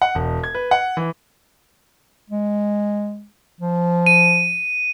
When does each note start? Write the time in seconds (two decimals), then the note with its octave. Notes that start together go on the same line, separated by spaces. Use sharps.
0.02 F#5
0.15 E1
0.44 G#6
0.55 B4
0.71 F#5
0.97 E3
2.30 G#3
3.61 F3
4.06 D#7